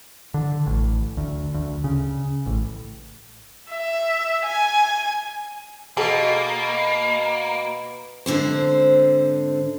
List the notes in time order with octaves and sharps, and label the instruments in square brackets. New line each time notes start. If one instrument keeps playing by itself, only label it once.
[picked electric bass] D3
A1
D2
D2
C#3
A1
[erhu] E5
G#5
[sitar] B2 [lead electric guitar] A#3 [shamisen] G#4 A4
[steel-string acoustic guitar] G#2 D3 C4 C5